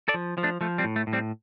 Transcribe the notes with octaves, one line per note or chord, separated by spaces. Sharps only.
A4 D5
F3
F3
A3 D4
F3 A3
G3 C4
A2
A3
A2
G3 C4